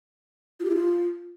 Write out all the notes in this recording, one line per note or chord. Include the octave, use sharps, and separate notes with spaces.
F4
G4
E4
F4